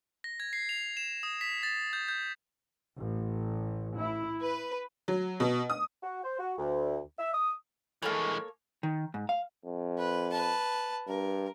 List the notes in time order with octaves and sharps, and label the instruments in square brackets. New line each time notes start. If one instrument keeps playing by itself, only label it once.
[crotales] A#6
G#6
C7
F7
E7
D#6
B6
A6
G6
G6
[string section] A1
E4
B4
[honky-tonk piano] F#3
B2
D#6
[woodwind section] F#4
C5
F#4
D2
E5
D#6
[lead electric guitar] E3 G#3 [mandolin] A#3 A4 C#5
[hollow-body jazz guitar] D#3
G#2
F5
[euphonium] F2
[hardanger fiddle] B4
B4 A5
[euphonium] G2 [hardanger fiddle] A#4